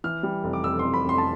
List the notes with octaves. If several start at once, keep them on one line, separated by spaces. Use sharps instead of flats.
E3 F6
G3
F1
D6
F2 E6
F1 C6
B5
F2 C6
A5